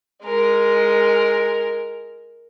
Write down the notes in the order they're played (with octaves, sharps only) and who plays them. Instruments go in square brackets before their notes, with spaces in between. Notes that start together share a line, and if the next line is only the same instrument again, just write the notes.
[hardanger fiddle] G#3 A#4